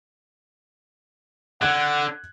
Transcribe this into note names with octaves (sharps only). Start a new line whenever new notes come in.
D3 F#5 F#6 G#6